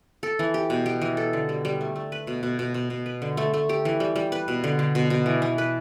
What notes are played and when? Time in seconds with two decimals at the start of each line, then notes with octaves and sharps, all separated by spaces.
0.23 A4
0.39 E3
0.54 G4
0.70 B2
0.86 G4
1.02 E3
1.17 A4
1.33 D3
1.49 G3
1.65 G3
1.81 A3
1.96 A3
2.12 B4
2.27 B2
2.43 B2
2.59 B2
2.74 B2
2.90 B2
3.06 B4
3.22 D3
3.37 A3
3.54 A3
3.69 G4
3.85 E3
4.00 G3
4.16 G3
4.32 B4
4.48 B2
4.64 D3
4.79 D3
4.95 B2
5.10 B2
5.26 E3
5.42 E3
5.58 B4